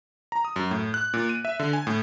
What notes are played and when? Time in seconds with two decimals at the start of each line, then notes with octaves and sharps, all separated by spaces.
0.32 A#5
0.45 D#6
0.56 F#2
0.71 A2
0.94 F#6
1.14 A#2
1.29 D#7
1.45 E5
1.59 D3
1.73 G#5
1.87 A2